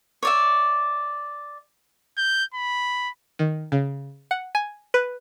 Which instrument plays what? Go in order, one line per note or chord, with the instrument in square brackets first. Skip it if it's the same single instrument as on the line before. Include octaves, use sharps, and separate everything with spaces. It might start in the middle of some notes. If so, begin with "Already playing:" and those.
[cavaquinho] C#5 D5 E5
[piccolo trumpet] G6
B5
[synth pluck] D#3
C#3
F#5
G#5
B4